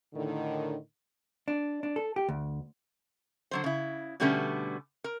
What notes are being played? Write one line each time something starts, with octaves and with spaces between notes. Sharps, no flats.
A2 D3 D#3
D4
D4
A4
G4
D2
D3 F#3 C5
C#3 E4
B2 D3 G3 A3 B3 C#4
A#4